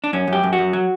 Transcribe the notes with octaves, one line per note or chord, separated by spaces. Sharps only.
D4
F#2 C#4
F#2
G4
F#2
F#4
F#2
F#3